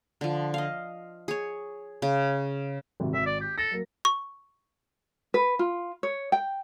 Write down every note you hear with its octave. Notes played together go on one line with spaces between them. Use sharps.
D3 F3
D#5 F5
G#4 C#5
C#3
G#1 C3
G#1 E5
D5
G4
A4 A#6
F#3 A#3
C#6
B4
F4
C#5
G5